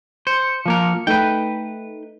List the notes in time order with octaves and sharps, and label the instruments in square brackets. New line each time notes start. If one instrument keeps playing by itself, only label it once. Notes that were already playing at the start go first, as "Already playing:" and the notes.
[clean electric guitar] C5 [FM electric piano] C#7
[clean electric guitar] F3 A#3 A#4
[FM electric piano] A3 D#4 [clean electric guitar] B4 G5